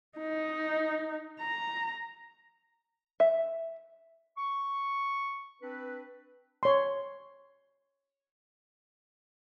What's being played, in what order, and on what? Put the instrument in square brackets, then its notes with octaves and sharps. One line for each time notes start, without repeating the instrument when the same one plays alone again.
[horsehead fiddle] D#4
A#5
[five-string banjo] E5
[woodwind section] C#6
C4 D4 B4
[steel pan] C#5 C6